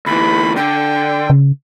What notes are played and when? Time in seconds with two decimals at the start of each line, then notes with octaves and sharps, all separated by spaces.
0.06 D2 E3 B5
0.56 D3 G5
1.30 C#3